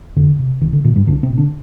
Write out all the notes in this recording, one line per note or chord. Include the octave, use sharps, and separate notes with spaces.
F2 D3
C3
C2 D#3
D3
A#2 D#3
G2 G3
C2 D3 D4
C3 C4
A#2
D3 D4